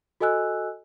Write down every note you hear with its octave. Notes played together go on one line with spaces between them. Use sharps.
F#4 A4 D#5 G#5 E6 F#6